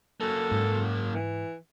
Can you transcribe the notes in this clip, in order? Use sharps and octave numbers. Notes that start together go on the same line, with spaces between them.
F#2 A#3 A4
G#2
E3